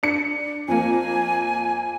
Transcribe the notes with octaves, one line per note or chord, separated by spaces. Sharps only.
D4 C#7
F2 A#3 G#5